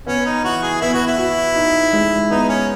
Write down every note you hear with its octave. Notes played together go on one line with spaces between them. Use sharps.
B3 C#4
D#4
E3 F#4
G#4
B3 E4
F#4
E4
F#4
D#4
G#3
B3 D#4
C#4